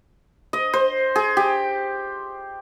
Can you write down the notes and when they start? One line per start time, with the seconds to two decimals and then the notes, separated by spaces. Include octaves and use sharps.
0.53 D#5
0.73 C5
1.16 G#4
1.37 G4